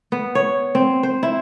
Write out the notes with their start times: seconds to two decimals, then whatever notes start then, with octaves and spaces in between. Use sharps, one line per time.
0.12 B3
0.35 C#5
0.75 C4
1.03 C5
1.23 E4